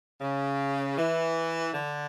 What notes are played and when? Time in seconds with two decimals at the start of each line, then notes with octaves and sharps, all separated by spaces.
0.21 C#3
0.97 E3
1.72 D3